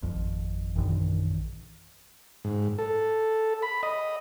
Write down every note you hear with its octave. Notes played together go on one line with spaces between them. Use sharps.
G#1 F2
A#1 F#2 D#3 E3
G#2
A4
B5
D#5